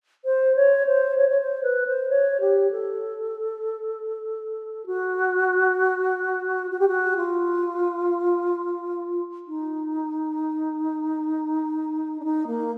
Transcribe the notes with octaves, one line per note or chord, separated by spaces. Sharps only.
C5
C#5
C5
C#5
C#5
C5
B4
C5
C#5
G4
A4
F#4
F#4
G4
F#4
F4
D#4
D4
D#4
A#3